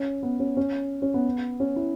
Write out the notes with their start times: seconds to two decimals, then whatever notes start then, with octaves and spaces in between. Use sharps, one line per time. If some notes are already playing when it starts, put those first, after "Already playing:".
Already playing: C#4
0.23 B3
0.40 C#4
0.57 C#4
1.02 C#4
1.14 B3
1.60 C#4
1.76 E4